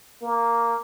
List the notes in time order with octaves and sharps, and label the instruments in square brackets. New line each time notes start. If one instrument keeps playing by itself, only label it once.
[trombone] A#3